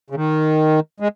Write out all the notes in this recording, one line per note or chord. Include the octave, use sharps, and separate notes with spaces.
C#3
D#3
G#3